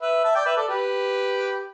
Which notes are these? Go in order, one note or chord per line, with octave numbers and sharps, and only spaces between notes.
B4 E5
E5 A5
D5 G5
B4 E5
A4 D5
G4 B4